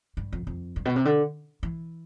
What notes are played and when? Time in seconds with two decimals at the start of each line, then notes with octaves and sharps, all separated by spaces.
0.17 G2
0.32 F2
0.47 F2
0.76 G2
0.85 B2
0.96 C3
1.05 D3
1.63 E3